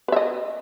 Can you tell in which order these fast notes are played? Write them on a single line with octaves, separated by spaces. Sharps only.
B4 E5 D#5